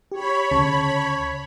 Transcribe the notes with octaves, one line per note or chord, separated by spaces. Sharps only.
G4 C#5 B5
D2 C#3 A5